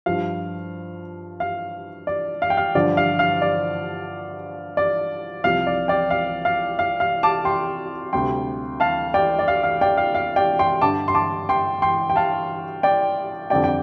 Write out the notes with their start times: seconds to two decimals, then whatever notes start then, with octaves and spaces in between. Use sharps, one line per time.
0.06 G2 F3 F5
1.40 F5
2.07 D5
2.42 F5
2.50 G5
2.57 F5
2.75 G2 D3 F3 D5
2.97 F5
3.19 F5
3.42 D5
4.77 D5
5.44 C2 C3 F3 F5
5.67 D5
5.88 D5 G5
6.10 F5
6.45 F5
6.79 F5
7.00 F5
7.23 A5 D6
7.45 G5 C6
8.13 D2 C3 G3 G5 C6
8.80 F5 A5
9.14 D5 G5
9.39 D5
9.48 F5
9.63 F5
9.81 D5 G5
9.97 F5
10.15 F5
10.36 D5 G5
10.59 G5 C6
10.81 G2 D3 G3 A5 D6
11.08 C6
11.15 A5 D6
11.49 G5 C6
11.82 G5 C6
12.10 G5
12.16 F5 A5
12.83 D5 G5
13.50 F2 D3 G3 D5 G5
13.64 G5